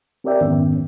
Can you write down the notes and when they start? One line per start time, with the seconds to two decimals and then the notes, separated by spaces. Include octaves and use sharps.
0.24 C4 G4 A#4 D5 E5 G5
0.41 F2 G#2 D#3 B3 C#4